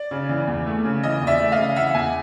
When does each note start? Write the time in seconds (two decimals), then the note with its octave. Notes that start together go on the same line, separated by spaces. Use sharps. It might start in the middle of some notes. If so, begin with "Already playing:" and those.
Already playing: D5
0.11 C#3
0.29 E3
0.47 E2
0.67 A3
0.85 C#3
1.03 E3 D#5
1.21 E2
1.27 D5 E5
1.40 A3
1.52 D#5 F5
1.57 C#3
1.76 E3 E5 F#5
1.94 E2 F#5 G#5